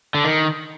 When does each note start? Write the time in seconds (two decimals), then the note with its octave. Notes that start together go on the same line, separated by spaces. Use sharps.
0.14 D3
0.24 D#3